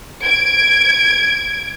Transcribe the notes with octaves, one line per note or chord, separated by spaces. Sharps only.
G#6 D7